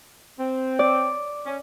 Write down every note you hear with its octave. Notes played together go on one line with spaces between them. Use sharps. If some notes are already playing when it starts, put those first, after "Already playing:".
C4
D5
C#4